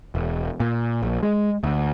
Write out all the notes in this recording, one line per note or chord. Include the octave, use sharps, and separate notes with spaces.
E1
A#2
A#1
G#3
D2